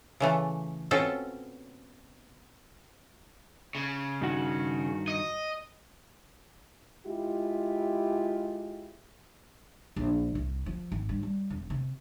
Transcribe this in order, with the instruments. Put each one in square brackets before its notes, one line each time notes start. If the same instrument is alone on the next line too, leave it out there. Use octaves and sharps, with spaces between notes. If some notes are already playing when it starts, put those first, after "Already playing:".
[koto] C#3 E3 A3
B2 C4 C#4 F4 A4 C5
[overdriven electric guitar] C#3
[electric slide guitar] G2 D#3 F#4
[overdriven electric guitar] D#5
[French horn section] G#3 E4 F4 G4
[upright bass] A#1
C2
F3
G#1
G2
G3
E1
C3